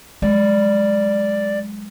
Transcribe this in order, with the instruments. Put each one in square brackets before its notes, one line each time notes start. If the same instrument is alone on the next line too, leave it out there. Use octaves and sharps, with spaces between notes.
[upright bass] F#3 G#3 [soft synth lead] D5